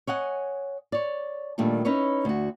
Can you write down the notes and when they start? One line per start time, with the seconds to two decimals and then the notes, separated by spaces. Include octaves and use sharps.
0.07 C#5 D#5 F#5 G#5
0.92 C#5 D5
1.58 A#2 D#3 G3 A3 D4
1.85 C#4 D#4 E4 B4 C#5
2.25 D2 F#4